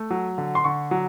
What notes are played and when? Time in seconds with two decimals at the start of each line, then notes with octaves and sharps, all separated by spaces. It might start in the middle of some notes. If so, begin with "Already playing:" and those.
Already playing: A3
0.10 F#3
0.38 D3
0.55 C6
0.64 D3 C#6
0.91 F#3